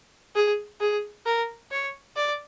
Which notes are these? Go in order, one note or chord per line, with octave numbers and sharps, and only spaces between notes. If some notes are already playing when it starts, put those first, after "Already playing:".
G#4
G#4
A#4
C#5
D5